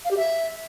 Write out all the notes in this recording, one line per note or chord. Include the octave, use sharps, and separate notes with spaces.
F5
G4
E5